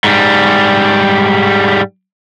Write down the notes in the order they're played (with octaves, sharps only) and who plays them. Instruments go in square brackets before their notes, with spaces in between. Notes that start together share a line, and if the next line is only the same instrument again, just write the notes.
[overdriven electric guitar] G#2 G3